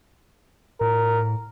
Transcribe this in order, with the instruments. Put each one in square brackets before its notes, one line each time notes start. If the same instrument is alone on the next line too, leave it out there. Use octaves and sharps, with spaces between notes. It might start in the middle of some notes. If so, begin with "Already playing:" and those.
[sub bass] A2 [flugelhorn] A#4